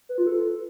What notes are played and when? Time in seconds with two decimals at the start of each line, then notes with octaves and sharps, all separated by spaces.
0.09 B4
0.18 F4
0.27 A4